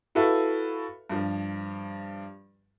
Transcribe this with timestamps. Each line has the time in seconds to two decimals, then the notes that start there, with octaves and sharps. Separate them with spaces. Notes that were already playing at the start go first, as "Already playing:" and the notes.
0.15 E4 F#4 A4 B4 E5 F5
1.10 G2 F3